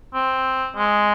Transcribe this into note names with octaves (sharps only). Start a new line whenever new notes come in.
C4
G#3